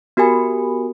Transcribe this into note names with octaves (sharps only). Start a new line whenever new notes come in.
B3 F#4 G4 A#4 G#5 B5